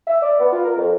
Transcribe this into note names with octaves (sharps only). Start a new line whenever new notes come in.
E5
D5
B3
F4
A#4
F2